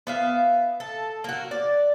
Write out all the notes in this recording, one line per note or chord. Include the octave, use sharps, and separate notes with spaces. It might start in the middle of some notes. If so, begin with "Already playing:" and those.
B3 E5 F5
A4
A#3 F#4
D5